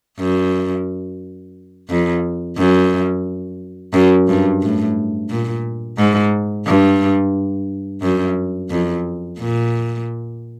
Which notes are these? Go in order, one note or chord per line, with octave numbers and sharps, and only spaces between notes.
F#2
F2
F#2
F#2
G2
A2
A#2
G#2
G2
F#2
F2
A#2